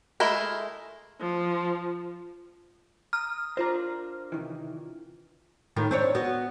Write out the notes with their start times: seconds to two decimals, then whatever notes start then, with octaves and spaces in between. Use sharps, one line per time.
0.20 G#3 A3 E4 A#4
1.20 F3
3.13 A#5 D#6 F6
3.57 D4 F4 A#4 C5 A#5
4.32 C3 D#3 E3
5.76 A2 D#3 F4
5.91 C4 D4 C#5
6.15 B3 F#4